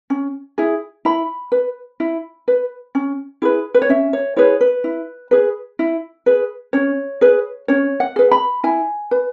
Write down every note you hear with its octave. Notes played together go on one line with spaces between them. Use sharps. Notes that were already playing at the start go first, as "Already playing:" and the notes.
C#4
E4 G#4
E4 B5
B4
E4
B4
C#4
E4 G#4 B4
B4
C#5
C#4 E5
C#5
E4 G#4 B4 C#5
B4
E4
G#4 B4
E4
G#4 B4
C#4 C#5
G#4 B4
C#4 C#5
F#5
G#4 B4
B5
E4 G#5
B4